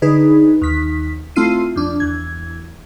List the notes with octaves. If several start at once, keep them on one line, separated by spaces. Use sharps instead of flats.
D3 D#4 G#4 B4
D#2 B6
A3 C4 E4 F4 C7 D#7
F2 D4
E2 G#6